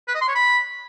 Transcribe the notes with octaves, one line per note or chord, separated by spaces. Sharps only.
B4
D#5
C6
C#5
B5